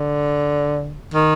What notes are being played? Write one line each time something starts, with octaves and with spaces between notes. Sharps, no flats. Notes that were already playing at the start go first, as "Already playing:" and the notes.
Already playing: D3
D#3